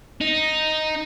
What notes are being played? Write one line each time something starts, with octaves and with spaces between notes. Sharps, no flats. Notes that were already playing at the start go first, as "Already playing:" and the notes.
D#4